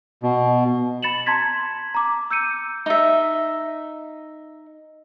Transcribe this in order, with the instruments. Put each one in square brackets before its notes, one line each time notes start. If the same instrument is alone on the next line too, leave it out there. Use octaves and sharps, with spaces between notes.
[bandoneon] B2
[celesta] B5 A6 C#7 E7 F#7
A5 A#5 C6 G#6 A6 B6
A#5 D6
E6 G6 C#7 D#7
[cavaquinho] D#4 E5